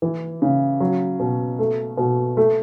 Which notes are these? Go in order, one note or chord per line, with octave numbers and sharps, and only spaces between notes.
E3
C#3
F#3
B2
A3
B2
A3